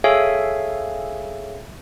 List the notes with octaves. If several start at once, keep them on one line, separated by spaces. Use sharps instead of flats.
G#4 A4 C#5 E5 F5 G#5